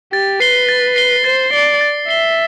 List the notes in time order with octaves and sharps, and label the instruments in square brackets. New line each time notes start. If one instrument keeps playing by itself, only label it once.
[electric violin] G4 [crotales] A6
[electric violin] B4 [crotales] C7 G7
[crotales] A6
C7 G7
[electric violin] C5 [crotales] A6
[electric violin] D5 [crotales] C7 G7
[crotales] A6
[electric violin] E5 [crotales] C7 G7